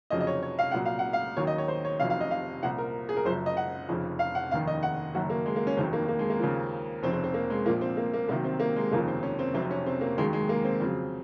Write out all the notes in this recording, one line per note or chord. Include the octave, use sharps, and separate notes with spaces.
F1 F2 C#3 F#3 D#5
D#5
C#5
C#5
F5
C2 A#2 F#3 F#5
F5
F#5
F5
D#2 D#3 F#3 C#5
D#5
C#5
C5
C#5
F1 F2 C3 F#3 F5
F5
D#5
F5
C2 A#2 F3 F#5
A#4
G#4
A#4
F#1 F#2 F3 C5
D#5
F#5
F1 F2 C#3 F3
F5
F#5
F1 D#2 D#3 F5
D#5
F#5
F#1 F#2 D#3 F#3 F#4
A#3
G#3
A#3
C#4
F1 D#2 D#3 F#3 C4
A#3
A#3
G#3
A#3
D#2 C#3 F3
F1 F2 C#3 C4
C4
C4
A#3
G#3
A#1 A#2 F3 A#3
C4
A#3
A#3
C2 C3 D#3 F#3 A#3
C4
A#3
G#3
F1 D#2 C#3 F3 A#3
C4
C#4
C4
F1 F2 C3 F#3 C4
C#4
C4
A#3
D#2 D#3 F#3 G#3
G#3
A#3
C4
F2 C#3 F#3